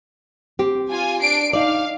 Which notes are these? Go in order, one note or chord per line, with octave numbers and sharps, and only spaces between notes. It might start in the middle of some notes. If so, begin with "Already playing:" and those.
C4 G4
F4 G#5
D4 C7 D7
D#4 D5 F5